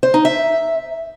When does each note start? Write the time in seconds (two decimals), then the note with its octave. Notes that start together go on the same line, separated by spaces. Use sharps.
0.03 C5
0.14 D#4
0.25 E5